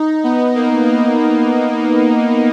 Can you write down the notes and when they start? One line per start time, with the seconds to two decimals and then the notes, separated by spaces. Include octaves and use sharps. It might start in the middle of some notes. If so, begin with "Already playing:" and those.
Already playing: D#4
0.24 B3
0.55 A#3
0.87 B3